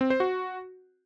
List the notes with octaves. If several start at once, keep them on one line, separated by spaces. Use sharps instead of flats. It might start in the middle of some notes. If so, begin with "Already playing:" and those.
C4
C5
F#4